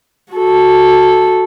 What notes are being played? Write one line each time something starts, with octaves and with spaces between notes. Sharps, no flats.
F#4 A4